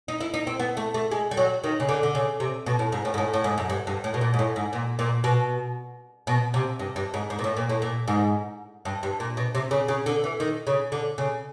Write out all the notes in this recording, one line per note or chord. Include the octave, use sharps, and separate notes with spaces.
D#4
E4
D#4
C4
B3
A3
A3
G#3
G3
F#3
D#3
C#3
D3
D3
C#3
C3
B2
A2
G#2
A2
G#2
A2
A2
G#2
F#2
G2
G2
A2
B2
A#2
G#2
A2
G#2
A#2
A#2
B2
B2
C3
G2
G2
G#2
G#2
A#2
A2
A#2
A2
A#2
G#2
G2
G2
A#2
B2
C3
C#3
C#3
D3
E3
D#3
C#3
D3
C#3